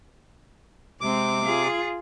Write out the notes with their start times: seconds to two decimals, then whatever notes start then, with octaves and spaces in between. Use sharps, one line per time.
1.01 C3 G#3 C4 D6
1.45 F4 G#4